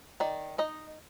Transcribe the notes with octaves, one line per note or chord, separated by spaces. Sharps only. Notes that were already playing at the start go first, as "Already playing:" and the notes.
D#3 D5
D#4 D#5